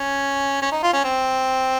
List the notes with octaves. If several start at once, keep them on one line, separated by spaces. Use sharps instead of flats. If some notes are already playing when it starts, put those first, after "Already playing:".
Already playing: C#4
C#4
D#4
F4
C#4
C4